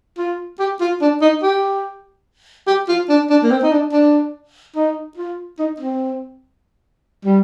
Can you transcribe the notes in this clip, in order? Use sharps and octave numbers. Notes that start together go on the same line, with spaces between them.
F4
G4
F4
D4
D#4
G4
G4
F4
D4
D4
A#3
C4
D#4
D4
D4
D#4
F4
D#4
C4
G3